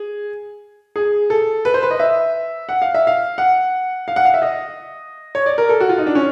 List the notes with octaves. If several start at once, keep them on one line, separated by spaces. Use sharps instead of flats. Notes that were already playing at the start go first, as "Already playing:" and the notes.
Already playing: G#4
G#4
A4
B4
C5
B4
D#5
E5
F#5
F5
E5
F5
F#5
F5
F#5
F5
E5
D#5
C#5
D5
A#4
A4
F#4
F4
D#4
D4
C#4